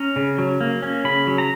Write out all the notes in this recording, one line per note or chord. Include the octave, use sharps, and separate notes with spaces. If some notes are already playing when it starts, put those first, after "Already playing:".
Already playing: C#4 A#5
C#3
F#3
A#3
C#4
C#3 B5
F#3
A#5